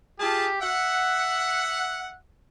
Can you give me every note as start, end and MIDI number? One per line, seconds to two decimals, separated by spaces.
0.20 0.47 65
0.20 0.59 67
0.20 0.47 68
0.20 0.47 81
0.61 2.17 76
0.61 2.12 78